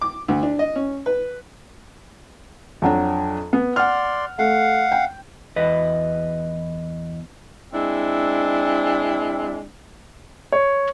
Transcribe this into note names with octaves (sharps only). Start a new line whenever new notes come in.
D6
D2
D4
D#5
C#4
B4
F2 F#3 D4
B3
D5 F#5 C6 F6
A3 F5 F#5
G5
E2 B4 D#5
G#3 C4 D4 E4
C#5